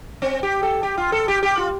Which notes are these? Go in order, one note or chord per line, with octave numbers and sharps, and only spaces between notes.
C4
G4
A4
G4
F4
A4
G4
G4
F4